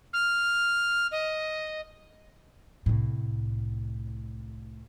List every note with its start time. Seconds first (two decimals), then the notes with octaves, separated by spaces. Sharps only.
0.13 F6
1.12 D#5
2.86 C2 A2